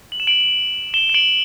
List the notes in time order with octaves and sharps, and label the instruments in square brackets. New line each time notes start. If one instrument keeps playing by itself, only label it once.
[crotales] F#7
E7
D7 F#7
E7 G7
E7
D7 F#7